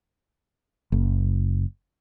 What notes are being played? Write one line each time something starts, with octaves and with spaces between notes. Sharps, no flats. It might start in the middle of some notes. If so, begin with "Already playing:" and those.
F#1